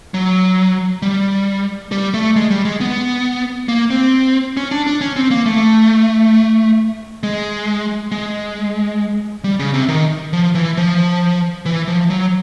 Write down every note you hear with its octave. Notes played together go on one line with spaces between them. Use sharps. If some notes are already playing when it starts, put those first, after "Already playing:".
F#3
G3
G3
A3
G#3
G3
G#3
B3
A#3
C4
C#4
D4
D4
C#4
C4
A#3
A3
G#3
G#3
G3
C#3
C3
D#3
F3
E3
F3
E3
F3
F#3